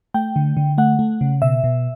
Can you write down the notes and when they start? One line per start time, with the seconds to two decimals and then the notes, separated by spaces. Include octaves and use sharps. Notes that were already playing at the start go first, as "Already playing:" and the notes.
0.14 A3 G5
0.36 D3
0.57 D3
0.78 A3 F#5
0.99 A3
1.21 C#3
1.42 B2 E5
1.64 B2